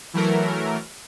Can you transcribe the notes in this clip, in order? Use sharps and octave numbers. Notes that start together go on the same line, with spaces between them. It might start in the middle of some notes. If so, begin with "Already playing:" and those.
E3 F#3 A3 A#4